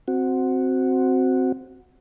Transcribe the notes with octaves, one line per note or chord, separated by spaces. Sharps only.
C4 F#4